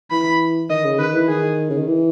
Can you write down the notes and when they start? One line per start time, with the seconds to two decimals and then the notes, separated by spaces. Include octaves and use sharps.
0.11 E3 B5
0.70 D#3 D#5
0.84 C#3
0.99 D#3 B4
1.14 E3
1.28 D#3 G#4
1.70 C#3
1.78 D#3
1.87 E3